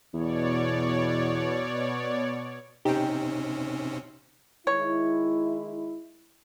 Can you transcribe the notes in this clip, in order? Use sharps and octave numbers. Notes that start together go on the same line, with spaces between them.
E2 B2 C#5 D5
C3 C4 C#4 D#4 G4 G5
D#3 G#3 E4 C#5